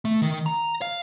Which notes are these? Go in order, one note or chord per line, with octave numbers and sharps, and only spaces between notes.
A3
D#3
A#5
F5